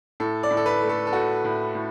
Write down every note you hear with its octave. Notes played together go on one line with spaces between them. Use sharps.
A2 A4
D5
A2
A4
B4
A3
A4
A4
A3 F#4
A2
A2